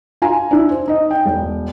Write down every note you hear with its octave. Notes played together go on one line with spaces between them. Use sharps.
F4 G#5 A#5
D4 E4
C5
D#4 D#5
G5
E1